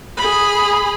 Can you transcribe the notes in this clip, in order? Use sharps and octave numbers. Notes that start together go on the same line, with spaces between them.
G#4 B5